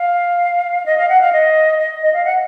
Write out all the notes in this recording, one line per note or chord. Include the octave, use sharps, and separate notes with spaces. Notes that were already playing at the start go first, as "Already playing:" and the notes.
Already playing: F5
D#5
F5
F#5
F5
D#5
D#5
D#5
F5
F#5